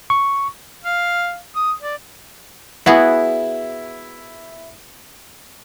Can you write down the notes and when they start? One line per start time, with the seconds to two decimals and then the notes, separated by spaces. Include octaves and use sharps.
0.10 C#6
0.84 F5
1.55 D#6
1.82 D5
2.86 B3 E4 F#4 G#4